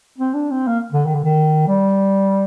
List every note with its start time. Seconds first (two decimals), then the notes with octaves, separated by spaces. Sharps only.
0.18 C4
0.34 D4
0.51 C4
0.67 A#3
0.92 D3
1.06 D#3
1.15 D3
1.24 D#3
1.68 G3